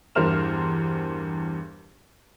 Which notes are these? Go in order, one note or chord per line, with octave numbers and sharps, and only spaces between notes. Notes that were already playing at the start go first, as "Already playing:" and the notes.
E2 G2 A#4 C5 F6 E7